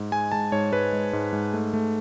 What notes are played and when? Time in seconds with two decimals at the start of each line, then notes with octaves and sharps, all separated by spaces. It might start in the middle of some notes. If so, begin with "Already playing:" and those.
Already playing: G#2
0.12 G#3 G#5
0.32 G#3 A5
0.52 G#2 C#5
0.72 G#2 B4
0.93 G#3
1.13 G#2
1.33 G#2
1.54 A3
1.74 A3